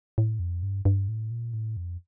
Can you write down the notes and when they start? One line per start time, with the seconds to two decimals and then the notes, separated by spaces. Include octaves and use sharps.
0.18 A2
0.39 F2
0.63 G2
0.85 G2
1.08 A2
1.31 A#2
1.54 A2
1.77 F2